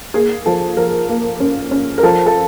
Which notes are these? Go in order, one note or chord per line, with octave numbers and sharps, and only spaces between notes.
A#3 G#4
F3 A4
F3 A#4
A#3
C#4
C#4
A#4
F3 A4
A4